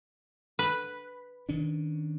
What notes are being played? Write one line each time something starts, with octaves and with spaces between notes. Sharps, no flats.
B4
D#3 C#4 D4